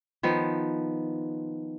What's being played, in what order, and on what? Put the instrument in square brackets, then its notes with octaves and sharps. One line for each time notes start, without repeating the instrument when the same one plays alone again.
[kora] D#3 F3 B3